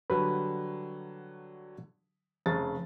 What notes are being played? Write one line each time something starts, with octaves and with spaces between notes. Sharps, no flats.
D3 F#3 G3 B4
F1 C#3 A6